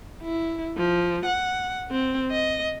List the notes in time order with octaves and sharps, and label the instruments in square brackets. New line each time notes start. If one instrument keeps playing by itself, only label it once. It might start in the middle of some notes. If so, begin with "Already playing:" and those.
[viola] E4
F3
F#5
C4
D#5